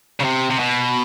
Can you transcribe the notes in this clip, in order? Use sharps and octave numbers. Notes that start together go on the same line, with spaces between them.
C#3
C3
C3
B2